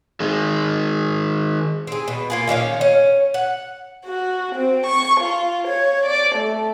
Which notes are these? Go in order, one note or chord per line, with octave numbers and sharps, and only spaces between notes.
D#3 G#3
C4 G#4
B2
A#3 F4 G#4
A#2 D#3 C#4 F5
C#4
F#5
F#4
C4
C#6
F4
C#5
D5
A3